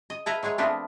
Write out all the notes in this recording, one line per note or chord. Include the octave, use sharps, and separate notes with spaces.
D#5
E4 A4 B4 F5 A#5
F#3 G#3 G#4 C#5
F3 A3 B3 C4 D4